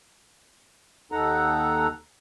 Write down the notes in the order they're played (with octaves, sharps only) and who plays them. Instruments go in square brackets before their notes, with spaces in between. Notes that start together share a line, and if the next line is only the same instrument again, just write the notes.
[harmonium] D#2 D#4 A4 F#5 A#5